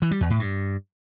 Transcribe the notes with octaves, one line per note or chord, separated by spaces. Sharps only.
E3
G3
E2
A2
G2